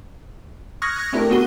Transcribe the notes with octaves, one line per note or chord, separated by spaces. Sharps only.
C#6 D#6 F6 F#6 G#6 A#6
A3 C4 D4 E4 G4 A#4
B3 C4 F#4 G#4 D#7 G7